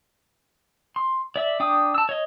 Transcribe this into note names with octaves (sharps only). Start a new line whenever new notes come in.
C6
D5 E5
D4 G5 D6 D#6
A5 E6
C#5 D#5